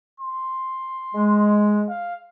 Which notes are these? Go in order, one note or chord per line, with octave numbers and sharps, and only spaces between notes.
C6
G#3
F5